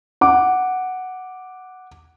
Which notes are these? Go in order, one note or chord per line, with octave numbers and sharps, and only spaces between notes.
F#5 D6